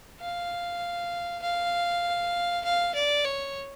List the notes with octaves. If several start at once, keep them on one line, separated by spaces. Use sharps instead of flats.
F5
F5
F5
D5
C#5